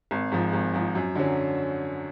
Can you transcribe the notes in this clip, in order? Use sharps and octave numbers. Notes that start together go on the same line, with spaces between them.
G#1
G#2 F3
G#1
G#2 F3
F#2
D3 F#3 C#4